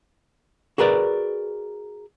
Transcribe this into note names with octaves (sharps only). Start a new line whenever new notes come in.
F#4 G#4 A#4 B4 D5